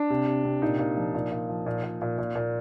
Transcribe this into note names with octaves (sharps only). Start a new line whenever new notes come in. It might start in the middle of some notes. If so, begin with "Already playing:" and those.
Already playing: D4
C3
C3
C3
A#2 D#4
A#2
F3
A#2
A#2
F3
A#2
A#2
A#2
A#2
A#2